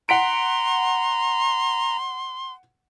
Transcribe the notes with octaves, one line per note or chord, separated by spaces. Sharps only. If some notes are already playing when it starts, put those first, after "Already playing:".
F#5 A#5 C6 B6 D7